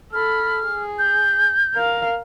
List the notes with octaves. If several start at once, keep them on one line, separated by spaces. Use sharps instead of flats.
A4 B5 F6
G#4
G6
A#4 F5